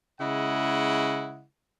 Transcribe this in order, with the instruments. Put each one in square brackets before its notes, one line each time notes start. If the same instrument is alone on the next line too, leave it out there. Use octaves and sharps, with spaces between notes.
[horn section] C#3 G#3 E4 D#5 F#5